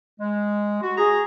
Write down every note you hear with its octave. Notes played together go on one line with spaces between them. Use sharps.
G#3
F#4
G#4 A#5